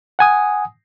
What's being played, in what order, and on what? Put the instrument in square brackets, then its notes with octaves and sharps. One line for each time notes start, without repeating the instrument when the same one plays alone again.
[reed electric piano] F#5 G#5 D#6